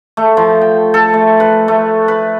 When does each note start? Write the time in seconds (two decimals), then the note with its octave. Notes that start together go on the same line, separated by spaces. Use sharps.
0.17 A3
0.37 F3
0.61 G5
0.94 A4
1.14 A3
1.40 B4
1.68 A3
2.08 B4